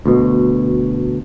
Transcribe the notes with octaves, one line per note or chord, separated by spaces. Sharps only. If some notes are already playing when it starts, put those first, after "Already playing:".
D2 B2